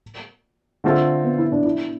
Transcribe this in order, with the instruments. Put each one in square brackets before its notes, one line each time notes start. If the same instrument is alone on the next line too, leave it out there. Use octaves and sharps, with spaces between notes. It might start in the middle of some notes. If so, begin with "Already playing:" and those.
[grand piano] D3 A3 C4 F4 A4
[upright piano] B3
E4
D4
E4